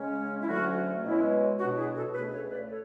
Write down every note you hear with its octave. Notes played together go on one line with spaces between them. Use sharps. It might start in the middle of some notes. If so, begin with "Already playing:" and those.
Already playing: C#3 G#3 C#4
E4
D2 D3 F#3 A3 C#4 F#4
B2 G#3 C#4 E4
B2 F#3 B3 D4 F#4
E4 G#4
F#4 A4
C#2 B2 A3 G#4 B4
A4 C#5
B4 D5
A4 C#5